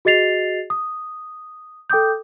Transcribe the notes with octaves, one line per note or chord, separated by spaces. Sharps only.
F#4 G#4 D#5 A6 C7 F7
D#6
A4 G5 D6 D#6 G6